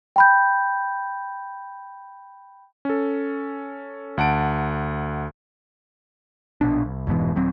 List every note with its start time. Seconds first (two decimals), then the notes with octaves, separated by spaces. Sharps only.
0.16 G5 B5 G6
2.85 C#4 A4
4.17 D2 F#5 A5 D7
6.61 A#1 B2 D4
6.85 C2
7.07 F1 G#2 B2 E3
7.36 D#1 F#3 C4